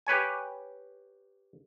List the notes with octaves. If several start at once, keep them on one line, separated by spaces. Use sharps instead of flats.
G4 B4 C#5 G#5